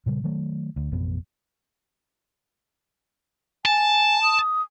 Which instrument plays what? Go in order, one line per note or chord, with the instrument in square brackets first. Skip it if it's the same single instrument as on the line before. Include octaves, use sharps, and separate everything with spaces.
[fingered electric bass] A#2 C#3 G3
D#3 F#3 A3
D2
A1 F2 B2 B3
[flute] G#5 [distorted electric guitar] A5
[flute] D#6